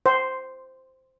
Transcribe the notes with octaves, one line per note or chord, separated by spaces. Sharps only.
C5